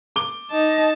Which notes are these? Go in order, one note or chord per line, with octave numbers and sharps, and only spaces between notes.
D6 G7
D#4 D#5 A5